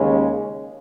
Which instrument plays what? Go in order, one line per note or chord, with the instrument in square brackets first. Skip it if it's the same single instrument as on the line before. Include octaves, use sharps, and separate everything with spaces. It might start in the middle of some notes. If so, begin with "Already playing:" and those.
Already playing: [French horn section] D#2 C#3 G#3 C#4